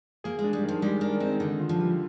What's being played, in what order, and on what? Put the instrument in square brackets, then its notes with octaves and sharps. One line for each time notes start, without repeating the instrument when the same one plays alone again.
[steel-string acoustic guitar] A#3 [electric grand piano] G#4
[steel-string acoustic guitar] G#3
[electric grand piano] D4
[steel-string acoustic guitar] G3
[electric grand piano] D#3
[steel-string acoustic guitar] F3
[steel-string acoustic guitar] G3 [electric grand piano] G#3
[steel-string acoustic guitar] D4 [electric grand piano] A#4
[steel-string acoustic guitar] C4 [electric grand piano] D#4
[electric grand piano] D3 [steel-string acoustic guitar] D#3
[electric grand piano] F4
[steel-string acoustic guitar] F3
[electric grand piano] G3